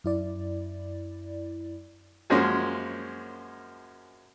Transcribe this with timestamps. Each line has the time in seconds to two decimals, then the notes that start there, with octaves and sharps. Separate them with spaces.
0.04 F#2 E4 D5
2.30 F#2 F3 G#3 A#3 C#4 C6